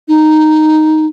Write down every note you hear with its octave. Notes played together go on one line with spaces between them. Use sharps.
D#4